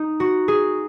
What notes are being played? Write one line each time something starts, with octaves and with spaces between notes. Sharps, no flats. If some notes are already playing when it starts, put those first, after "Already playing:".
Already playing: D#4
F#4
G#4